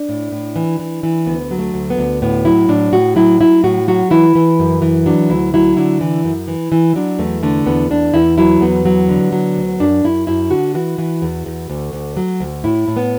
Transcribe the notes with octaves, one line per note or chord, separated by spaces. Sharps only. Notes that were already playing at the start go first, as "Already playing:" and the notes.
Already playing: D4
A2
A2
E3
E3
E3
D2 B3
F#3
A3
D2
B3
D2
A2 B3
F#3 E4
A2 D4
A2 F#4
F#3 E4
F#3 E4
A2 F#4
F#3 F#4
E3 E4
E3
F#2
E3
F#3 D4
D2 E4
F#3 E4
D3 E4
E3
F#2
E3
E3
F#3 D4
E2 A3
D3 A3
E2 B3
E2 D4
E2 E4
F#3 E4
E2 B3
F#3
D3
F#3
D2
F#2 D4
F#2 E4
F#2 E4
D3 F#4
E3 F#4
E3
E2
E2
D2
D2
F#3
D2
A2 E4
A2
B3